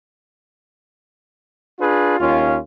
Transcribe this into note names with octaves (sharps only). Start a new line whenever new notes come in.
D4 F4 G#4 B4
D#2 C#4 F4